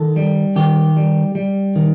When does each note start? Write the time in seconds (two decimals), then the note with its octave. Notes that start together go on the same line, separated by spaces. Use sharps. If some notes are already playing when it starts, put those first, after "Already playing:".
Already playing: D#3 A4
0.16 G3
0.56 D#3 G4
0.97 G3
1.35 G3
1.76 D#3